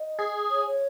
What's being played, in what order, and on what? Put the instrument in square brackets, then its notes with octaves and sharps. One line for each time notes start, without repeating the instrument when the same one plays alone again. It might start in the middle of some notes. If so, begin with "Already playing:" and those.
Already playing: [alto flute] D#5
[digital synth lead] G#4
[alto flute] C#5
C#5